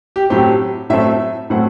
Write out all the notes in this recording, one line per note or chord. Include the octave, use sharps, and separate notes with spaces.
G4
A2 F#3 A3 C4 G4
A2 F#3 A3 C4 E5
A2 F#3 A3 C4 F#5